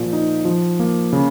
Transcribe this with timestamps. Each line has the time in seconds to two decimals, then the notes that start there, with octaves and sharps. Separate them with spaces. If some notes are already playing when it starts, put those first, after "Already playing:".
Already playing: A#2 F3
0.13 D#4
0.45 F3
0.80 A#3
1.13 C#3